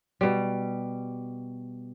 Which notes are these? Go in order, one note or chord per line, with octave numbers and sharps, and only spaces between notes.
B2 G3